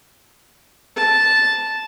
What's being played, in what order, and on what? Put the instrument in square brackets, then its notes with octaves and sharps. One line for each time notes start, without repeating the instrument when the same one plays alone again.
[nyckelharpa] A5